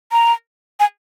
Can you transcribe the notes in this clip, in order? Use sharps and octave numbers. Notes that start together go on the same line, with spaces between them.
A#5
G#5